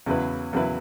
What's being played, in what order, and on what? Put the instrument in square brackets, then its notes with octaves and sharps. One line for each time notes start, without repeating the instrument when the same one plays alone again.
[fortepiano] E2 C#3 F#3 E4 B4
E2 C#3 F#3 E4 B4